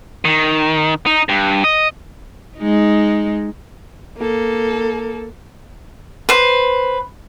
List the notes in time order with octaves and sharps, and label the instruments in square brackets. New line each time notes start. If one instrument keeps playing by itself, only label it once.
[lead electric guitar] D#3
D#4
G2
D#5
[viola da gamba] G#3 D#4
[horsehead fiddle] A#3 A4
[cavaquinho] B4 C5